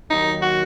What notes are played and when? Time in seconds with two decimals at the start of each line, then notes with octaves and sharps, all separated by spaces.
0.10 D#2 D#3 F#3 D#4
0.42 F#4